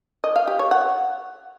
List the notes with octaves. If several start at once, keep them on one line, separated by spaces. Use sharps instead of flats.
D#5
F5
G4
C#5
F#5